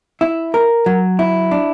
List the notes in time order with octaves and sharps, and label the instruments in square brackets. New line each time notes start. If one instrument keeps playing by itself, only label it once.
[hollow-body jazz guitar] E4
A#4
F#3
E4
D4